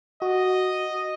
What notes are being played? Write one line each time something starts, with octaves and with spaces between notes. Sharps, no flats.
F#4 D#5